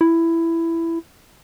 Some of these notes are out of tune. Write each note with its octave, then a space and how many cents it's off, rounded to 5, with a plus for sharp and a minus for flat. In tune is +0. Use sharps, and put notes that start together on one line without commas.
E4 +10